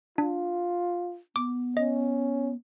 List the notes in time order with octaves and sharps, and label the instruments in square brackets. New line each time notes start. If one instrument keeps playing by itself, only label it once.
[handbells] D4 [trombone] F4
[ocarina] B3 [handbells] D6
[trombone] C#4 [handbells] D#5